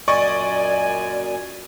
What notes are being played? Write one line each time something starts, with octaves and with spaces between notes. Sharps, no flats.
F#2 A#2 D5 D#5 G#5 C#6 A6